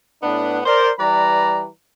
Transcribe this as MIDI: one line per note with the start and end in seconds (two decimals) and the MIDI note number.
0.22 0.59 45
0.22 0.59 59
0.22 0.59 62
0.66 0.91 70
0.66 0.91 72
0.66 0.91 74
0.99 1.67 52
0.99 1.67 55
0.99 1.67 71
0.99 1.67 74
0.99 1.67 82